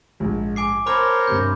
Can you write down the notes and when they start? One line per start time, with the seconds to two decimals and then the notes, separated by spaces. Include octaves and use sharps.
0.20 A#1 G#2
0.56 G#5 D6 C7
0.86 A#4 C5 C#5 A5 B5 D6 F6
1.27 G2 C3 G6